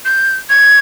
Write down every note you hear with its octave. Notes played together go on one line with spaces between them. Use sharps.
G6
G#6